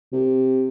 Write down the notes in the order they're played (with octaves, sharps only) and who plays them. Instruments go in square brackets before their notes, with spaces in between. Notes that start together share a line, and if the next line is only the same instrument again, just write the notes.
[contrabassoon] C3